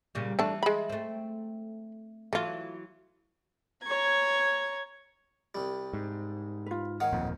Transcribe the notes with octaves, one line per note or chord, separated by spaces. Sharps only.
A#2 C#3 G3
E3 A3 D4 A5
G#3 B5
A3 C4
E3 F#3 A3 F4
C#5 A#5 G#6
C2 G3
G#2
F4 B4
D#3 C#5 F5 F#5 D#6
D1 F2 A#2